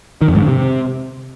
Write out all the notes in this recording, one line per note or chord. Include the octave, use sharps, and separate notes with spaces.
D#3
F2
G#2
D3
C3